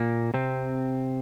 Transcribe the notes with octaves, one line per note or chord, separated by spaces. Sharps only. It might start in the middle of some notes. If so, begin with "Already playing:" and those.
Already playing: A#2 A#3
C3 C4